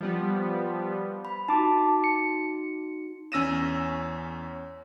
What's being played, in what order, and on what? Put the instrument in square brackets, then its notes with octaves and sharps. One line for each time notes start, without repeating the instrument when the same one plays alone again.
[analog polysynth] F3 G3 B3
[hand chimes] B5
[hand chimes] D#4 F#4 [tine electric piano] A5 D6
[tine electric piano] C#7
[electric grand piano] E2 C#4 E6 A#6 D#7 E7